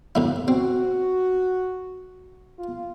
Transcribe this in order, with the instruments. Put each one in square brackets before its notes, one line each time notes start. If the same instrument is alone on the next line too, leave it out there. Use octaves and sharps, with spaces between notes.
[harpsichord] D2 A2 E4
[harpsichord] C4 [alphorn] F#4
[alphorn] F4